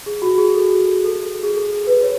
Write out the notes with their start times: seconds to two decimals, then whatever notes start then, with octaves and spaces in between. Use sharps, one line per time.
0.06 G#4
0.22 F#4
0.38 G#4
0.54 A4
1.04 A4
1.43 G#4
1.53 A4
1.87 B4
2.03 C#5